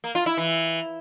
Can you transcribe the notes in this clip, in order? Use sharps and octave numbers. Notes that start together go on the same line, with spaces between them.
A#3
F4
E4
E3